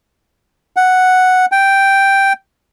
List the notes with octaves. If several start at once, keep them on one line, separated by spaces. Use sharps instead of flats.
F#5
G5